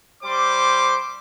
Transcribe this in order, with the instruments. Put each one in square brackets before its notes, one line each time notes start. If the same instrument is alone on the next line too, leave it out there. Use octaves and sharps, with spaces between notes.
[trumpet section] G3 C5 C6 D6